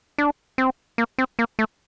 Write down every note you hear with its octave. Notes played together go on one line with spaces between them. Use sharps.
D4
C4
A#3
C4
A#3
A3